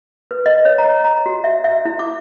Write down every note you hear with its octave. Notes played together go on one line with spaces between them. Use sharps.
B4
D#5
C#5
A#5
A#5
F#4
E5
E5
E4
D6